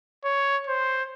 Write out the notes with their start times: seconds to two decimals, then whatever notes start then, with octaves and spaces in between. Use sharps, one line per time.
0.24 C#5
0.67 C5